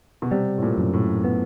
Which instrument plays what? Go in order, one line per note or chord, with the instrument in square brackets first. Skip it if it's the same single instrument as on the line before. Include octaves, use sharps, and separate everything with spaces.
[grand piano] B2
[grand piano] C3 [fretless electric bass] G3
[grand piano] A2
A#2
[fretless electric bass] F#2
[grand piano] A2
[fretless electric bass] B3